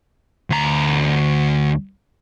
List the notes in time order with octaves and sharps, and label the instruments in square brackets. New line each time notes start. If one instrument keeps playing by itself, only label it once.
[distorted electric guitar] D2 A#5